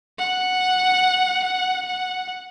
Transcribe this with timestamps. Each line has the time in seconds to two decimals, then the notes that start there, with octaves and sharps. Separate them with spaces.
0.19 F#5
1.44 F#5
1.86 F#5